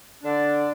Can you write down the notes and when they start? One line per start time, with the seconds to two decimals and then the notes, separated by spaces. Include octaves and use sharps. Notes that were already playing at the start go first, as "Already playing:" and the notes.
0.24 D3 D4